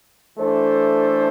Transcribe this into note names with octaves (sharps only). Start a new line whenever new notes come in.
E3 A3 D4 A4 C5